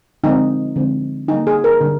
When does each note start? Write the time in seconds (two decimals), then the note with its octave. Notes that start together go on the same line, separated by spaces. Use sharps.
0.24 D3 F3 G#3 C4 D#4
0.76 D3 F3 G#3 C4
1.28 D3 G3 A#3 D#4
1.47 G#4
1.64 A#4
1.81 D3 G3